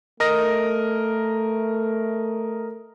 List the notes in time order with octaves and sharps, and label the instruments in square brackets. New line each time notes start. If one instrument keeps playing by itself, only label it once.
[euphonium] A3 [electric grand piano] A#4 D#5 A#6